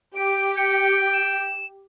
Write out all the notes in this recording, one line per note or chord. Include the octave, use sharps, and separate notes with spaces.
G4 D7
G5 C#7
E7